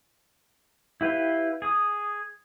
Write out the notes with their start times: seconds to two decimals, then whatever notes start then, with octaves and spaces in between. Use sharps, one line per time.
1.01 E4 G4 B4 F5 G5
1.62 G#4 D#6